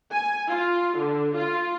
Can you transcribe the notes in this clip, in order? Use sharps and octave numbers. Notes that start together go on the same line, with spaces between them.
G#5
F4
D3
F4